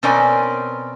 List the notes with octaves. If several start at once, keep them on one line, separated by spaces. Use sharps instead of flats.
B2 C4 C#4 A#4 D5 G#5